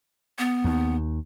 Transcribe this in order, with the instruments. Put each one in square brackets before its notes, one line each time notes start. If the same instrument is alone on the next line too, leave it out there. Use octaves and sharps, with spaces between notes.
[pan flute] B3
[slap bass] D#2